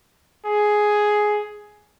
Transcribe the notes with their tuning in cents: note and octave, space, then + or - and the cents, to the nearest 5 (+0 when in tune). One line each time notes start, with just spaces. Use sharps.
G#4 +10